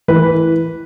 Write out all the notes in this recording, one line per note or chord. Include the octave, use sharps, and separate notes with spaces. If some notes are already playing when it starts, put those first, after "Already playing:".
E3 B4